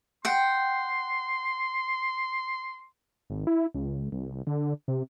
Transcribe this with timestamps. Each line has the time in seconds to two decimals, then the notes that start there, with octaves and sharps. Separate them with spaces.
0.25 F#5 G5 C6
3.30 G#1
3.47 E4
3.74 C#2
4.12 C2
4.47 D3
4.88 C3